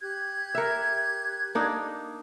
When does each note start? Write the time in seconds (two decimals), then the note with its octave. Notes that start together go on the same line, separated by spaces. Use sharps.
0.01 G4 F#6 G#6
0.55 A#4 E5
1.55 A#3 D4 D#4